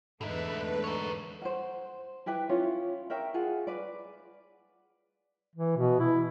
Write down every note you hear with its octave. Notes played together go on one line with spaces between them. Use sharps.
E2 G#2 B2 D3 A3 D#4 B4 E5
A#4 C#5
C5 F#5
E4 G4 B4 G#5
C#4 E4 F4 C#5
A#4 C#5 E5 G5
F4 G#4 F#5
B4 D5
E3
B2
E4